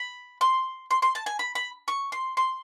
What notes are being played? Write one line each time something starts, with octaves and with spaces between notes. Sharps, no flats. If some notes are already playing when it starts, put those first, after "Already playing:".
Already playing: B5
C6
C6
C6
A5
G#5
B5
B5
C#6
C6
C6